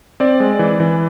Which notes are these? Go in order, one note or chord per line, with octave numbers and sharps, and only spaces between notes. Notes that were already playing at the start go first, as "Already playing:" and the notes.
C4 D5
G#3
E3
E3